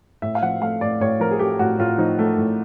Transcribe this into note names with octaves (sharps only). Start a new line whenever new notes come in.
A2 E5
F5
F3 F#5
A3 F5
A2 D5
A2 C#5
F3 A#4
G#4
A3 G4
A2 F#4
A2 F4
F3 D#4
A3
A2